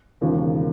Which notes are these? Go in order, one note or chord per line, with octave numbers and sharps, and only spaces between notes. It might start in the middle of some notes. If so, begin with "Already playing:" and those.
E1 D#2 C#3 F3